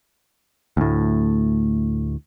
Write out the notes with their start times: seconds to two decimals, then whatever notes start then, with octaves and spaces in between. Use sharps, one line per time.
0.77 D2 A2